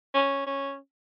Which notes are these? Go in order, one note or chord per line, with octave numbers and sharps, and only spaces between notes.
C#4
C#4